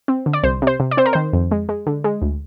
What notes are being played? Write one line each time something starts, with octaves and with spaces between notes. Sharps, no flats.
C4
D3
D5
C2 C5
C3 C5
C3
D5
C4 C5
A#4
D#3 C5
F2
G#3
G#3
D3
G#3
D2